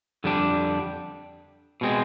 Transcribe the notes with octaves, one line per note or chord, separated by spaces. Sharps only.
F2 D3 G3 D4
B2 G#3 C4